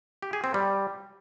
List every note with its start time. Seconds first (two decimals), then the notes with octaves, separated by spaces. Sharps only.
0.22 G4
0.33 G#4
0.44 C4
0.54 G3